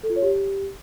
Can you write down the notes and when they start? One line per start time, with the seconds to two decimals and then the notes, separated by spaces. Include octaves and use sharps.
0.03 A4
0.10 F4
0.16 C#5
0.22 G4